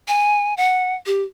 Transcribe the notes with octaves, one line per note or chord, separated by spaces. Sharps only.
G#5
F#5
G4